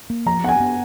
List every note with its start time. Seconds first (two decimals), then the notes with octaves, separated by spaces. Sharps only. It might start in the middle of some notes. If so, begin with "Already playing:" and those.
0.10 A#3
0.26 F3 A#5
0.44 B3 F#5
0.49 G#5
0.60 B3